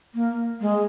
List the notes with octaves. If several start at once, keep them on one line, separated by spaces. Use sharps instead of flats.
A#3
G#3